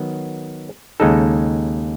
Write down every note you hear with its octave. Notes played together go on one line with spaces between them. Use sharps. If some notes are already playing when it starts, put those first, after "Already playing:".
Already playing: D#3 F#3 B3
D#2 C#3 G#3 D#4 A4